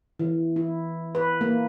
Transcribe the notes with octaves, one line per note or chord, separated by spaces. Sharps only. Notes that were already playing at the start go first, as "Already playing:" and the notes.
E3
E4
B4
A#3